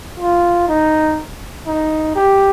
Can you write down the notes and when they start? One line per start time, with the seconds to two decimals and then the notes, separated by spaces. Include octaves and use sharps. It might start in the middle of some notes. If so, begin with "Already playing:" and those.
0.19 F4
0.68 D#4
1.67 D#4
2.16 G4